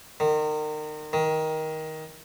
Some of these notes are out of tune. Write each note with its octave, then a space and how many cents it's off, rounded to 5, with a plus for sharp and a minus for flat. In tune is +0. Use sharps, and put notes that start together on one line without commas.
D#3 -30
D#3 +15